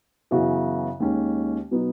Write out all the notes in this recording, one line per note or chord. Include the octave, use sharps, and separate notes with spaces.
F#2 C#3 E3 B3 F#4
D#2 D#3 G#3 C#4
B2 F#3 B3 D#4